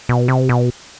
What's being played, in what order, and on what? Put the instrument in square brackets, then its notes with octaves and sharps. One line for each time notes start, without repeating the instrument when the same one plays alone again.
[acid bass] B2
C3
B2